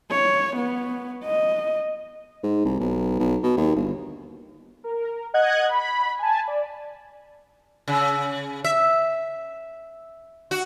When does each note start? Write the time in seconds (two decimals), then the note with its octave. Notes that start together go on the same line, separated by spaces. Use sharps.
0.11 C#5
0.56 B3
1.24 D#5
2.43 G#2
2.65 C2
2.80 B1
3.19 B1
3.43 B2
3.57 D#2
3.76 G1
4.84 A#4
5.34 D#5 F#5 F#6 G#6
5.69 B5
6.19 G#5 A5
6.48 D5
7.88 C#3
8.64 E5
10.51 F#4